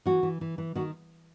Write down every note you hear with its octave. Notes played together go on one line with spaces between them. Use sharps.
E3 F#4
E3
E3
E3
D#3 F#4